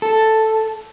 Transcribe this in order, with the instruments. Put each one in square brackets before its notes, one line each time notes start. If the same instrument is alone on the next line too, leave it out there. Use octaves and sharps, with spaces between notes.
[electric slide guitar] A4